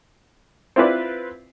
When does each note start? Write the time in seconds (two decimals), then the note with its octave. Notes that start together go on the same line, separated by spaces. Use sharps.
0.76 C4 E4 F4 B4 D5